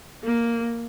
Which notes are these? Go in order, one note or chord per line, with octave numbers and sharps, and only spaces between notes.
A#3